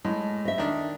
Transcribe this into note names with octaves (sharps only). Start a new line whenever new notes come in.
A2 G#3
D#5 E5
D#3 D4